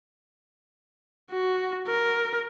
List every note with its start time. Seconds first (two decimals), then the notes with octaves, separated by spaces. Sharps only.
1.31 F#4
1.87 A#4